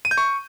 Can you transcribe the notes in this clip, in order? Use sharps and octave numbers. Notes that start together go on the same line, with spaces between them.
D#7
G6
C#6